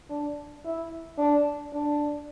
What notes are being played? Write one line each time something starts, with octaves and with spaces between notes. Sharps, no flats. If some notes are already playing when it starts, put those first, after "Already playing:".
D4
E4
D4
D4